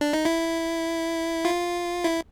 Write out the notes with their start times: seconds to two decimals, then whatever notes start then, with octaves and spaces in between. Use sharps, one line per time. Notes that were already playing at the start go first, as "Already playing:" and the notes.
0.01 D4
0.13 D#4
0.25 E4
1.45 F4
2.04 E4